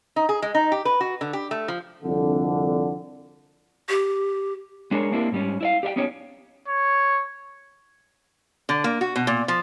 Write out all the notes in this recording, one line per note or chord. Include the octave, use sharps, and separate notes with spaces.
D#4
G#4
G#3
D#4
G4
B4
F#4
D3
G4
A3
F3
C2 F2 D3
G4
G#3 D4 G#4 A#4 C#5
A#3 C4 D4 E4 G4 A#4
G#2 G3 C#4
E4 D5 F5
G4 D5 E5 G5
B3 C#4 D#4 G4 C#5
C#5
D3
A#3
F#4
B2
A#2
F3